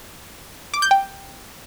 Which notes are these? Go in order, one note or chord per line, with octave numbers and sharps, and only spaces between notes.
D6
G6
G5